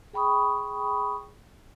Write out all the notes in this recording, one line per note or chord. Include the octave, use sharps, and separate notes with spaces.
G#4 G5 B5 C#6 D#6